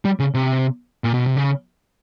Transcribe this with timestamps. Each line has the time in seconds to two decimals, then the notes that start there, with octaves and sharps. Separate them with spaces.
0.05 G3
0.20 C#3
0.34 C3
1.04 A#2
1.14 B2
1.26 C3
1.36 C#3